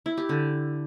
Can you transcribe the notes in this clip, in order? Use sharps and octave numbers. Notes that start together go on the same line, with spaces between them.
E4
G4
D3